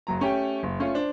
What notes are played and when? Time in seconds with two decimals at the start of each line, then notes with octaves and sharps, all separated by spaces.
0.07 F#1 F#3 A#5
0.20 A3 C#4 G4 G5
0.63 F#1
0.79 A3 C#4 F4
0.94 D4 C5